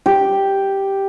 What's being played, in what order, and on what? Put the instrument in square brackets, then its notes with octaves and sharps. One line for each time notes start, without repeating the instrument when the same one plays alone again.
[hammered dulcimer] G4